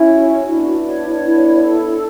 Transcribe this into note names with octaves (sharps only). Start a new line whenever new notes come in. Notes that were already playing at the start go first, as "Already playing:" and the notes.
Already playing: C#4 E4 C#5
F#4
B3 D4 E4
C#5
E4
A4